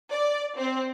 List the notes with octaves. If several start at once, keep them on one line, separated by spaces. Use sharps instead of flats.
D5
C4